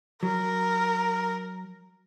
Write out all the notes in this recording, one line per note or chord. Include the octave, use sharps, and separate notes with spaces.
F#3 A#4